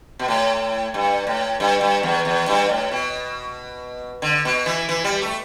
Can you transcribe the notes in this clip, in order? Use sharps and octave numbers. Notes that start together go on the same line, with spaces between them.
B2
A2
G2
A2
G2
G2
E2
E2
G2
A2
B2
D3
B2
E3
E3
G3
A3